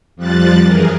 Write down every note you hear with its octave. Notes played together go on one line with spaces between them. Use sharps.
F2 F3 G3 F#6 A6
F#2 E3 G#4 A#4